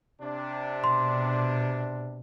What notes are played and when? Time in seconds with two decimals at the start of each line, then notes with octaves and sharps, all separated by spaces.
0.22 C3 D4
0.84 B2 C6